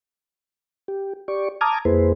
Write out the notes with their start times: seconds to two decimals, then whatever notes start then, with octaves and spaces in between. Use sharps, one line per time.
0.88 G4
1.28 G4 D5 C#6
1.61 A5 A#5 D6 D#6 F6 G#6
1.85 F2 A#3 E4 G#4 B4 C5